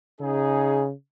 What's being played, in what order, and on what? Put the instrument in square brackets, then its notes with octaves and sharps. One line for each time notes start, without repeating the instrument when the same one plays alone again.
[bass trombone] C#3 [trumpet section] D#4 G#4